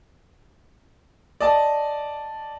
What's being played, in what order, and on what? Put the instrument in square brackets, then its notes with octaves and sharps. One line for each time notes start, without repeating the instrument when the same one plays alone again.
[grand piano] D5 D#5 A5